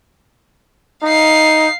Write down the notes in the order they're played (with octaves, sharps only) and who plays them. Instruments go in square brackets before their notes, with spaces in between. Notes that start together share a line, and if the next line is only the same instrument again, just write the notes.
[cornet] D#4 [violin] F5 C7